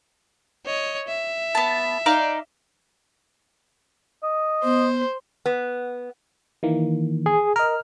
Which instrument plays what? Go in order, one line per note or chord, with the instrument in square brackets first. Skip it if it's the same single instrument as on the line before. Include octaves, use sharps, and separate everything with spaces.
[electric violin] C#5 D#5
E5
[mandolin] B3 A5
D#4 D5 F5
[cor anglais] D#5
[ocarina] B3 [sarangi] C5
[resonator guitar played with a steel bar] B3
[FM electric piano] D#3 E3 A#3
[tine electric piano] G#4
[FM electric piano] A#4 D#5 [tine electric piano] F6